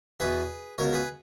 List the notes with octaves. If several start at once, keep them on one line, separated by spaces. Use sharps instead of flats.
E2 B2 G#4 B4
C#2 B2 A#4 C#5
G#4 B4